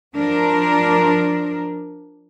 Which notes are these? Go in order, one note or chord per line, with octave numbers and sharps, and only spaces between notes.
F3 D4 A#4